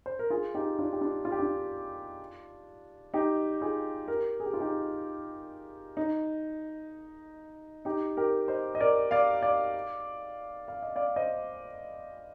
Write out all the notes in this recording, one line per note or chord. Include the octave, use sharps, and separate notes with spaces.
C5
A#4
F4 G#4
D#4 G4
D4 F4
G4
D4 F4
F4
G4
D4 F4
D#4 G4
F4 G#4
G4 A#4
G#4
G4
F4
D#4 G4
D#4
D#4 G4
G4 A#4
C5 D#5
D#5
A#4 D5
D5 F5
D5 F5
F5
D#5
D5 F5
C5 D#5